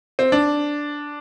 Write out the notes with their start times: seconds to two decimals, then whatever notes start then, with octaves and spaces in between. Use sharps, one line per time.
0.19 C4
0.32 D4